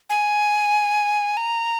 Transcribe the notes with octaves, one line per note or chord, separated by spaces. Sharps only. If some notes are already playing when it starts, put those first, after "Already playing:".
G#5
A#5